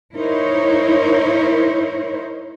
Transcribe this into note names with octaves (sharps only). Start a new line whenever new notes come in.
D#4 E4 A#4 C5 C#5